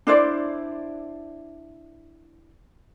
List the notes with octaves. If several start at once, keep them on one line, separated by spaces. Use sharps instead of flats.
D4 E4 C5 D5